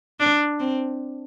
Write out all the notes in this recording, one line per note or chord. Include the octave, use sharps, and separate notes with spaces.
D4
C4